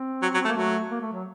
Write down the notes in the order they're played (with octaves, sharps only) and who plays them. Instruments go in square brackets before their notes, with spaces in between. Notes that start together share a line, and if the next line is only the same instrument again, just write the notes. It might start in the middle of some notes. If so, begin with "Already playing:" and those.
Already playing: [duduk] C4
[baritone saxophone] F#3
F#3
[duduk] C4
[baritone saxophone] A3
[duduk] A#3
[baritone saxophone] F#3 [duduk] A3
[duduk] A#3
A3
F#3